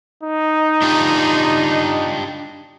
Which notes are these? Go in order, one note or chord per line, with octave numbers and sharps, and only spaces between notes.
D#4
D4 F4 G4